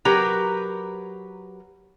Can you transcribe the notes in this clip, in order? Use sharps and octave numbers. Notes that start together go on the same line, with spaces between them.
F#3 G4 A#4 B4 A#5